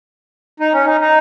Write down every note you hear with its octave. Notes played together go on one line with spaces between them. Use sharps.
D#4
C#4
D#4
D#4